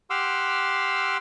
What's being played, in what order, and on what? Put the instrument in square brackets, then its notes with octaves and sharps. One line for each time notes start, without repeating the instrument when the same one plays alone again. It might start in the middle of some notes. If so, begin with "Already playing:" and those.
[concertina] G4 F#5 C6 D6 E6 F6